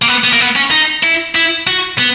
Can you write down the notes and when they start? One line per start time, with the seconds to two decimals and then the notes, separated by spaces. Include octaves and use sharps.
0.02 A#3
0.08 B3
0.24 B3
0.33 A#3
0.40 B3
0.56 C#4
0.71 D#4
1.03 E4
1.35 E4
1.67 F#4
1.99 B3